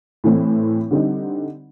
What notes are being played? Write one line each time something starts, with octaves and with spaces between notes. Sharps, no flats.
A2 E3 A3 C4
D3 G3 C4 D#4